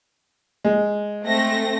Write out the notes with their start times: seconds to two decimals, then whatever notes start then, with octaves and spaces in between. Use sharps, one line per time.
0.65 G#3
1.24 A3 C4 A#6